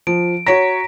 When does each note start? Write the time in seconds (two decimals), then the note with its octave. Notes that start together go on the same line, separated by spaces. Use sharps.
0.07 F3 D7
0.47 F#4 C#5 A#5 A#6 B6 D7